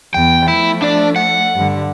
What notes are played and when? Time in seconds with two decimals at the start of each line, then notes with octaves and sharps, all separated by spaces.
0.14 E2 G5
0.48 F3 A3 E4
0.82 D4 D5
1.16 F#5
1.56 G2 D3